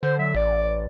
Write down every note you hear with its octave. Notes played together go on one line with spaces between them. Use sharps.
D3 C5
F#3 E5
A1 D5